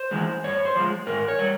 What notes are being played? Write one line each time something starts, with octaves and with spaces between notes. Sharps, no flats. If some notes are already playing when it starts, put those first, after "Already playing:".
Already playing: C5
E3 G#3
G2 C#5
C5
F3 G#3
G#2 A#4
C#5
G3